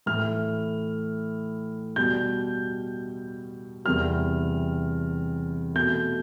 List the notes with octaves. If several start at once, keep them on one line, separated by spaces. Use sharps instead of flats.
A2 E3 A3 F6
B2 G3 G6
E2 C3 E3 G3 F6
B2 A3 G6